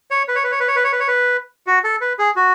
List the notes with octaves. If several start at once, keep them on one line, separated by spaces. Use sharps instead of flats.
C#5
B4
C#5
B4
C#5
B4
C#5
B4
C#5
B4
C#5
B4
F#4
A4
B4
G#4
F#4